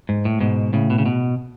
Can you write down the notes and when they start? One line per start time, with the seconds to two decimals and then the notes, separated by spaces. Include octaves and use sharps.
0.09 G#2
0.25 A2
0.40 G#2 B2
0.73 A2 C#3
0.90 B2
0.98 C#3
1.06 B2